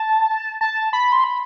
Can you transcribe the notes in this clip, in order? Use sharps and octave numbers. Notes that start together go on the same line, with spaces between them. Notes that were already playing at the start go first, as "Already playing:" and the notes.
Already playing: A5
A5
B5
C6
B5